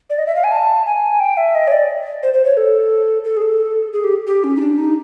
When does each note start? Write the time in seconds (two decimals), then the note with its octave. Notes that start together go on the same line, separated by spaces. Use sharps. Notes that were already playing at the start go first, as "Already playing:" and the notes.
0.10 D5
0.18 D#5
0.27 E5
0.36 F5
0.44 G#5
0.52 A5
0.86 G#5
1.20 G5
1.37 E5
1.55 D#5
1.68 C#5
1.72 D5
2.23 C5
2.34 C5
2.45 C#5
2.57 A4
3.24 A4
3.37 G#4
3.42 A4
3.93 G#4
4.04 G4
4.27 G4
4.44 C#4
4.56 D#4
4.61 D4
4.78 D#4